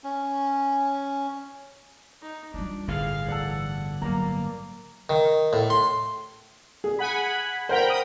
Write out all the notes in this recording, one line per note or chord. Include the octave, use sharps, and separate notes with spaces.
C#4
D#4
G3 D4 F4
G1 A2 G#4 F5
E3 A4 D5 F#5
F#3 A3 A#3 A#5
D#3
A2
C6
G#4
F#5 G#5 B5
A#4 C5 F#5 G5 B5
D#6